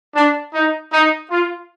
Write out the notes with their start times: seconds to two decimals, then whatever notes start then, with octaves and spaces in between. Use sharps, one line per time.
0.15 D4
0.54 D#4
0.93 D#4
1.31 F4